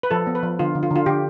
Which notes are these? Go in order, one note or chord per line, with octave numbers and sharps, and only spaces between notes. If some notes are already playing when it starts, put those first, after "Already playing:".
B4
F3 A4
B3
B4
F3
D3 F4
D3
F4
D3
F4
D3 G4